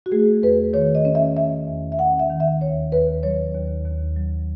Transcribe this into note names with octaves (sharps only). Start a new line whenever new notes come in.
F#4
A3 G#4
E2 B4
D#3 C#5
D#5
C#4
E5
C#4 E5
E2
E5
C#4 F#5
E5
D#3
E5
D#2 C#5
D#2 B4
F#3 C#5
D#2
D#2
F#3